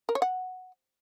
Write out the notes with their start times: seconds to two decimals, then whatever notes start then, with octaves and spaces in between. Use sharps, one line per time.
0.09 A#4
0.15 C#5
0.22 F#5